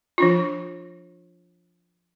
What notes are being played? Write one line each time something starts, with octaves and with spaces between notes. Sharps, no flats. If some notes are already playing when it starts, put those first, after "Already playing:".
F3 D4 F4